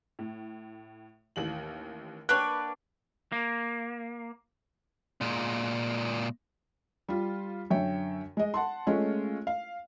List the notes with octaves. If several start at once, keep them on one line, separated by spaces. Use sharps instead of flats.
A2
A1 D#2 F#7
A#3 D4 B4 C#5 G5 F#6
A#3
A#2 G#3
G3 F4
F#2 D3 C#5 E5 G5
G#3 D#5
F#5 A5 C6
G#3 A3 C#4 F4 C#5
F5